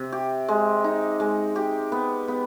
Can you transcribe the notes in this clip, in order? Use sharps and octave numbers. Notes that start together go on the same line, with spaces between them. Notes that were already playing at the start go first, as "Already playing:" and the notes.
Already playing: C3
G4
G#3
D#4
G#3
G4
B3
B3